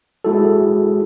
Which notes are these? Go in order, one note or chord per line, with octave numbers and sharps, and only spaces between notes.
G#3 E4 F#4 G#4 A4